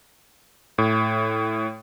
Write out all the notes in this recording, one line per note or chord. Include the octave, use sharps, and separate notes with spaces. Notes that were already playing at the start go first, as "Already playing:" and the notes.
A2